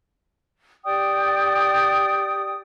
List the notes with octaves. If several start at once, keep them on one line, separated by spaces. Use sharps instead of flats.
G4 D5 G5 D#6